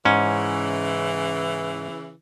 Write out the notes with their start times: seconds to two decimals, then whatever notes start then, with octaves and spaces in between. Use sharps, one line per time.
0.05 G#2 C#3 E3 C#4